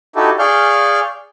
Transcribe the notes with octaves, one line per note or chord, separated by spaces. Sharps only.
D#4 E4 F#4 G4 A4
G#4 D5 F5 C#6 F6 G6